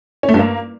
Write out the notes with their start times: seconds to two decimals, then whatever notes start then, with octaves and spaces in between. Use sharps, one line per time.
0.23 C#4
0.29 A3
0.34 G2
0.39 A#3